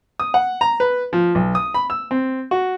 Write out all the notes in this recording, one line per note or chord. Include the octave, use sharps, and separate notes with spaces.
D#6
F#5
A#5
B4
F3
B1
D#6
B5
E6
C4
F#4